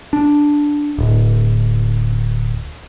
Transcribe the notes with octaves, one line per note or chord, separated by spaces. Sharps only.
D4
D1